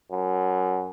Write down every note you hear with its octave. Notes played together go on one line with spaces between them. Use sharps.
F#2